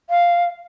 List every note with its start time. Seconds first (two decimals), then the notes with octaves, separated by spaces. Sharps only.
0.10 F5